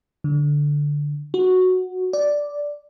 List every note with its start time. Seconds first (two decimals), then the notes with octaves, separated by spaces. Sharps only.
0.24 D3
1.34 F#4
2.13 D5